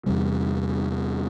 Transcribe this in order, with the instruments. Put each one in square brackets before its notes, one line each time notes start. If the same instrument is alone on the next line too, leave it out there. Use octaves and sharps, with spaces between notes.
[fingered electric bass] E2 C3 G3